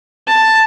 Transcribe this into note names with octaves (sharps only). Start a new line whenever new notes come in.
A5